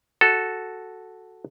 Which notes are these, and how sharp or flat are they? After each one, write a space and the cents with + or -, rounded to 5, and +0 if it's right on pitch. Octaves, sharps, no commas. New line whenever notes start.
F#4 +0 A4 -5